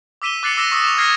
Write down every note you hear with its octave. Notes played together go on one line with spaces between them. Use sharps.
D6 E6 B6 D#7 E7 G7
D6 F#6 A6 C7 C#7 F#7
D6 E6 A#6 D#7 E7 G7
C#6 D#6 E6 C7
E7 F7
D#6 F6 G#6 A#6 C7 D#7